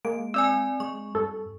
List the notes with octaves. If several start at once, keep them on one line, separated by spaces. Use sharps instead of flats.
G#3 A#3 D7
C4 D5 G#5 E6
G#3 C#6
G2 A4